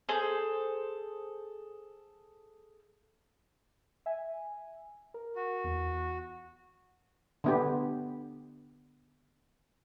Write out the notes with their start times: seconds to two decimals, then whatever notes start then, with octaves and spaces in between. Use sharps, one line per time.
0.09 G#4 A4 C5
4.06 E5 G#5
5.14 A#4
5.36 F#4
5.64 E2
7.44 D3 B3 G4